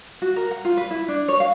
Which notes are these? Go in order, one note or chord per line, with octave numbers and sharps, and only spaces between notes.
F#4
A#4
F#5
F4
B4
E4
D4
C#5
F5